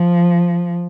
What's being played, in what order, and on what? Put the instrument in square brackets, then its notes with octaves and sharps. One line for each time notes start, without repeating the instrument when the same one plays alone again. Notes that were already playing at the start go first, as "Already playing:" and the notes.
Already playing: [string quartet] F3